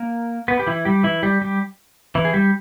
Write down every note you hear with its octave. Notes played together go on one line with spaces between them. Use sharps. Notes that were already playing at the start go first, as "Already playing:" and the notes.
Already playing: A#3 A#4
B3 B4
G4
E3 E4
G3 G4
E3 E4
G3 G4
G3 G4
E3 E4
G#4
G3 G4